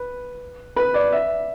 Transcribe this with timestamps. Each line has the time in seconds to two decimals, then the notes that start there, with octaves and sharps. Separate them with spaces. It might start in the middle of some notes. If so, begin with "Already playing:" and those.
Already playing: B4
0.76 B4
0.94 D5
1.12 E5